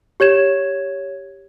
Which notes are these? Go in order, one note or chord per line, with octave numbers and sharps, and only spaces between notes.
G4 C#5 G#6 E7